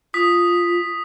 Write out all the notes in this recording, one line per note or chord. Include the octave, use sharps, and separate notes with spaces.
F4 D#6 B6